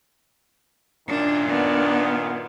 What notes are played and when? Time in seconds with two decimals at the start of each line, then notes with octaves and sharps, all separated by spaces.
1.08 F#2 A#2 D#3 D4
1.49 B3 D4